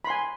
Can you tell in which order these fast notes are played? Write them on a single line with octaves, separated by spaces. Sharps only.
B5 C6 G#5